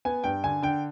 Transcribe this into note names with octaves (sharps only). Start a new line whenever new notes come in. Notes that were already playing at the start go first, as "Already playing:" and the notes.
B3 G#5
G2 G5
D3 G#5
D3 G5